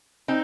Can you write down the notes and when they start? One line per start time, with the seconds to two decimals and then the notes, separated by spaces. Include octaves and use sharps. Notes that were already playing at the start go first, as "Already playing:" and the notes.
0.28 C4 D#4